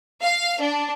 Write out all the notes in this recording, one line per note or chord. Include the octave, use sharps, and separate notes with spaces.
F5
D4